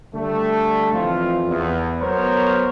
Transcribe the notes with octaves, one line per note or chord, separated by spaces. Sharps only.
D3 G3 A3
F2 E3 F4
E2
F#3 B3 A#4 C5 C#5